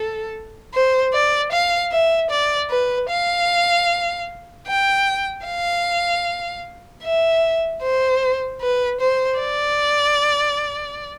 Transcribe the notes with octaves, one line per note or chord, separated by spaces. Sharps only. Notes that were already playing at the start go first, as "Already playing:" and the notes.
Already playing: A4
C5
D5
F5
E5
D5
B4
F5
G5
F5
E5
C5
B4
C5
D5